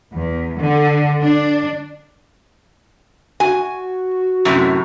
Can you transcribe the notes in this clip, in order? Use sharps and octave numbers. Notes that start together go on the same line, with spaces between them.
E2
D3
D4
F#4 G#5
F#2 A2 C3